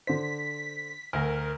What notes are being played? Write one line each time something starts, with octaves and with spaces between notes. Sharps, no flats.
D3 C5 B6
D2 A#4 G#5 A#6